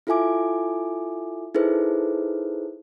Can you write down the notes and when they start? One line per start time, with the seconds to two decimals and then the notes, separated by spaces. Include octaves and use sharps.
0.07 E4 F4 A4 E5 G#5 D6
1.55 D#4 E4 G#4 A4 B4 C5